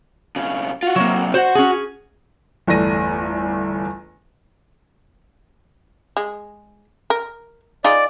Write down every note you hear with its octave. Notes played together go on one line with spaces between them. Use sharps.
B1 C#3
F4 F#4
B1 C3 F#3 A#3
F#4 C5 F#5
C#4 G#4
G1 E2 A3 D5 A#6 D#7
G#3
A#4
D#4 F4 G#4 D5